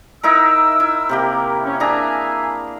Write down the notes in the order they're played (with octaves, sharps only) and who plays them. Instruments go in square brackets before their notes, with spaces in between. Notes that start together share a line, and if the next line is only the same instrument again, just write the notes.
[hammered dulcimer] D#4 E4 A#4 [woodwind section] E6
[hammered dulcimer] E4
C3 A#3 G4
[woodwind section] C#4
[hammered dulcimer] D4 G#4 A#5 [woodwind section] E5 G#5